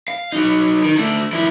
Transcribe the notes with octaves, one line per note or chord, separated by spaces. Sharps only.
F5
F#3 D#4
D#3
D3 A3
F3 E4